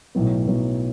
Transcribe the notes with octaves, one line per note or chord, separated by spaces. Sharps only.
B1 A2 F#3 B3
B1 A2 F#3 B3